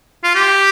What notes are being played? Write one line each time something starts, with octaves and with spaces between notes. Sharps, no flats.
F4
G4